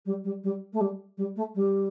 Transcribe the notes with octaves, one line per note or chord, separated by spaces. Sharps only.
G3
G3
G3
A3
G3
G3
A3
G3